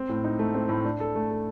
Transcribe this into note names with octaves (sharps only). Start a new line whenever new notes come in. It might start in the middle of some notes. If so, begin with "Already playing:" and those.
Already playing: C4
A2
D#4
A3
C4
A2
D4
A4
A3
A4